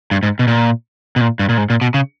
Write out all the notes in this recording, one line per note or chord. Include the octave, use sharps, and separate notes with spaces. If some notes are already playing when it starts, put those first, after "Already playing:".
G2
G#2
B2
A#2
B2
A#2
G2
A#2
G#2
A#2
B2
C#3